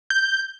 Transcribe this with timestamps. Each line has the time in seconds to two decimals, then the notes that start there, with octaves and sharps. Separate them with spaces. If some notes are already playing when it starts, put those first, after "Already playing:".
0.10 G6